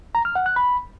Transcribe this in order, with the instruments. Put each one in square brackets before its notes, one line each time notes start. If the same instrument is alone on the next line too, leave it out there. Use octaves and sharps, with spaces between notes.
[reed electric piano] A#5
F6
F#5
F#6
B5